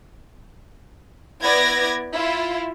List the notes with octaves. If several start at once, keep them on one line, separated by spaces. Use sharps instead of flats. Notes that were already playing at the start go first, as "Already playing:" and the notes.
B3 E4 B4 D5 G#6 A#6
E4 F4